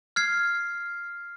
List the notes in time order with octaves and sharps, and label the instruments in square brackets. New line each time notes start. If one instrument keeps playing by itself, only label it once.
[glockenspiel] F6 G#6 C7